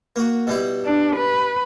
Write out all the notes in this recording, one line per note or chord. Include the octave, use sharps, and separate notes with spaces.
A#3 F#4
B2 G3 E4
D4
B4